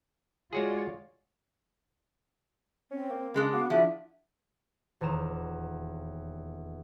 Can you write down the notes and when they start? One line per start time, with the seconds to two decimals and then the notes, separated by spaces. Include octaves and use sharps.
0.53 G#3 F4 F#4 G#4 C#5 D5
2.91 C4 C#4
3.10 A#3
3.34 C#3 G#3 D4
3.53 B3 F#4 F5 D6
3.70 F3 D4 E4 G#4 D5 E5
5.01 D#1 E2 A#5 E7